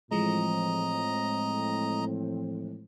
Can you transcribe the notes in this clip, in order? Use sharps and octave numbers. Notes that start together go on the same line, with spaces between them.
A2 E3 F3 G#3 C4 D#5 A#5